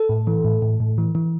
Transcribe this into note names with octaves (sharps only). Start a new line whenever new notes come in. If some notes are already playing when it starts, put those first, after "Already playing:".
Already playing: A4
A2
E3
A2
A2
A2
E3
E3